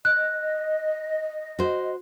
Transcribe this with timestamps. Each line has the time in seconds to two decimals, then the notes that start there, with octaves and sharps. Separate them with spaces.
0.05 D#5 F#6
1.59 F#4 C5